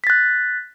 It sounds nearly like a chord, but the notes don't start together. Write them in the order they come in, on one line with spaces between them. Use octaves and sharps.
B6 A6 F#6